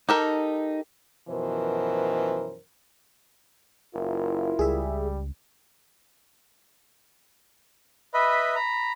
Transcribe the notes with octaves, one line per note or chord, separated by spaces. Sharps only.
D#4 G4 A4 A#4
F#2 B2 E3 F3 A#4 C5
F#1 E4 F4 A#4
C#2 G3 G#4 E5
B4 D#5 E5 B5
A#5 B5